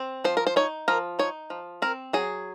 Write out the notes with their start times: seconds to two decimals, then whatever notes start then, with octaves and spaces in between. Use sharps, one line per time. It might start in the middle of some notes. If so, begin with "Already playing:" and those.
Already playing: C4
0.24 F3 C5
0.37 A#4
0.47 C5
0.56 D#4 C#5
0.88 F3 A#4
1.19 D#4 C#5
1.50 F3
1.82 C4 A#4
2.13 F#3 G#4